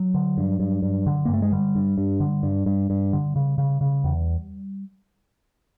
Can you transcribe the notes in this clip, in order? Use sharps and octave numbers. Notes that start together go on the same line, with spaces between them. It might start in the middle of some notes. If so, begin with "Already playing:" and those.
Already playing: F#3
D3
G2
G2
G2
D3
A#3
G2
A3
G#3
D3 G3
G2
G2
D3
G2
G2
G2
D3
C#3
C#3
C#3
E2